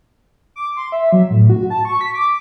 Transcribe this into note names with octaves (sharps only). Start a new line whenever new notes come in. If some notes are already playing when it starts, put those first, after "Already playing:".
D6
C6
E5
F#3
A2
F#4
A5
C#6
B6
D6